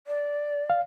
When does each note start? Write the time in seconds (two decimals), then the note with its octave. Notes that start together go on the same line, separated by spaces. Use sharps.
0.07 D5
0.70 F5